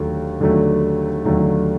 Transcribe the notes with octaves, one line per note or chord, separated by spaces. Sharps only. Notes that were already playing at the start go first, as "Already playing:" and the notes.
Already playing: D#2 D3 F#3 A3
D#2 D3 F#3 A3
D#2 D3 F#3 A3